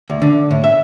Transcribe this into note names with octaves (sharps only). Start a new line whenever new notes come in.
D2
D3
A2
E5